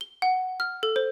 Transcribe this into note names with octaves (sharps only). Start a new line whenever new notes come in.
G7
F#5
F6
A4
C5